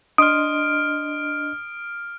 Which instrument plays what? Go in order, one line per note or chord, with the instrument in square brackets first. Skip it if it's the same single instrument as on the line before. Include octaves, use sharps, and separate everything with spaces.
[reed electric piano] D4 D#5 C6 [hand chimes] D#6 [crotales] F6 D7